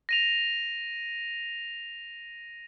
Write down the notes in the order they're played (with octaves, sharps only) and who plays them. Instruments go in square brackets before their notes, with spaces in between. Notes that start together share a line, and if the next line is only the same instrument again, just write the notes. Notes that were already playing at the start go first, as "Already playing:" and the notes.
[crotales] A#6 D#7 F7